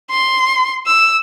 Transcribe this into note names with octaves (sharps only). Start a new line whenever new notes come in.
C6
E6